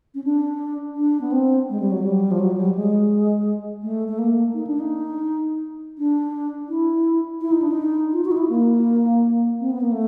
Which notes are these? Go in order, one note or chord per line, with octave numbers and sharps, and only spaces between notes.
C#4
D4
D4
B3
C4
G#3
G3
F#3
G3
F3
F#3
G3
G#3
A3
A3
A#3
D#4
D4
D#4
D4
E4
E4
D#4
D4
D#4
F4
F#4
D#4
E4
A#3
C4
B3
A#3
A3